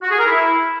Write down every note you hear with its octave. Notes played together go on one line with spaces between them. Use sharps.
F#4
G#4
A#4
E4